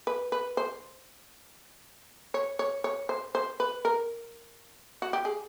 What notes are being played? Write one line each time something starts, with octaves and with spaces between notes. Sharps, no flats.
B4
B4
C5
C#5
C#5
C#5
C5
C5
B4
A#4
F#4
G4
G#4